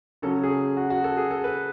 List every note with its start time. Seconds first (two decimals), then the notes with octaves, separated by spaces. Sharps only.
0.22 C#3 F#3 C#4 A4
0.43 G#4
0.77 F#4
0.90 F#4
1.04 A4
1.17 G#4
1.31 A4
1.44 B4